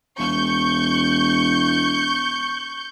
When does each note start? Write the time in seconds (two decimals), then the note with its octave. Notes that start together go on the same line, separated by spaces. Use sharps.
0.18 E1 C#6 G6